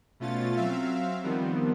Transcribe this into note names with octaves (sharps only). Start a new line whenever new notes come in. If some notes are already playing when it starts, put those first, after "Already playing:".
B2 A3 C#4 F4 A6
F#3 C4 E5 F5
D#3 F3 G3 B3 C4